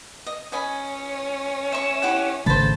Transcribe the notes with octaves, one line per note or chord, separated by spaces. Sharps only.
D#5
C#4 D#5 G#5 B5
E5 C#6 E7
E4 G4 F#5
G#1 C#3 A3 C5 A5 B5 A6